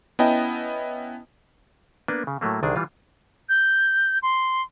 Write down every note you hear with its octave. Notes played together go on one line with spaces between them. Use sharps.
B3 C#4 E4 D#5 G5 A5
A#3 B3 D4 B4
C#3
A2 F#3 A3 A#3
C2 D3 D#3 D4 G#4
E3 G3 F4
G6
C6